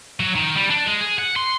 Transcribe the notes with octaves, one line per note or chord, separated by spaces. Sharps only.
F#3
D#3
G3
D4
G#3
G#4
F#5
C6